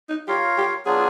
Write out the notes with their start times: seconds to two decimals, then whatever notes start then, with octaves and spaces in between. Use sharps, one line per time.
0.09 D#4
0.28 F4 G4 A#4 C#5 F5
0.57 G4
0.85 F#3 B3 D4 F4 G#4